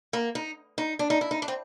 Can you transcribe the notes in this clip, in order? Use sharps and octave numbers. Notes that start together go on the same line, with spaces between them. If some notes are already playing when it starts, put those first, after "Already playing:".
A#3
D#4
D#4
D4
D#4
E4
D#4
D4
C4